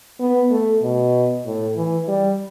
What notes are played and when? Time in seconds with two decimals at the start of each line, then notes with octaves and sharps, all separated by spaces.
0.20 B3
0.51 A3
0.82 B2
1.45 A2
1.77 E3
2.08 G3